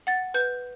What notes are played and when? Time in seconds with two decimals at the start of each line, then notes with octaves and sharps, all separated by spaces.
0.07 F#5 A6
0.34 B4 G6